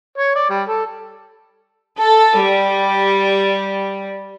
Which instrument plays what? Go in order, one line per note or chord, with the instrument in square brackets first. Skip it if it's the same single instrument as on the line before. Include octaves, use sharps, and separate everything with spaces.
[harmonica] C#5
D5
G3
A4
[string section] A4
G3